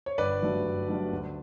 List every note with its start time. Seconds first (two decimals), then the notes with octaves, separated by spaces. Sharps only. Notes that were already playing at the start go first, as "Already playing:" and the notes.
0.06 C#5
0.18 G1 B4 D5
0.42 G2 F#3 A3 D4
0.64 G1
0.88 G2 F#3 A3 D4
1.12 D2